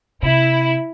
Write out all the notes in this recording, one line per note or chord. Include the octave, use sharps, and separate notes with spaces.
C3 E4